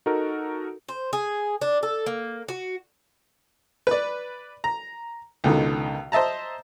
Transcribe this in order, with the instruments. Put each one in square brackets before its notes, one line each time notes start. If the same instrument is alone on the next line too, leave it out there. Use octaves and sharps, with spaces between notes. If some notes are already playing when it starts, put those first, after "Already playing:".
[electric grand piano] D#4 F#4 A4 A#4
[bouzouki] C5
G#4
D4
A4
A#3
F#4
[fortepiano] B4 D5
A#5
C#2 B2 D3 D#3
C5 D#5 E5 A5 A#5